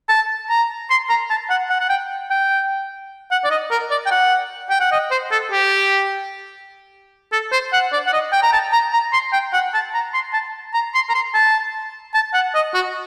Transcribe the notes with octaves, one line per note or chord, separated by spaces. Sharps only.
A5
A#5
C6
A#5
A5
F#5
F#5
F#5
G5
G5
F#5
D5
D#5
A#4
D5
G5
F#5
G5
F#5
D#5
C5
A4
G4
A4
C5
F#5
D5
F#5
D#5
G5
A#5
A5
A#5
A#5
C6
G5
F#5
A5
A#5
C6
A5
A#5
C6
A#5
C6
A5
A5
F#5
D#5
F#4